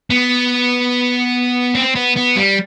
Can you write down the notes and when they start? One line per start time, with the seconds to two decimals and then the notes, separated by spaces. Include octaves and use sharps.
0.10 B3
1.75 C4
1.96 B3
2.17 B3
2.36 G3